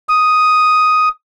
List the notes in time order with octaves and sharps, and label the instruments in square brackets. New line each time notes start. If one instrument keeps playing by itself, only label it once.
[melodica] D#6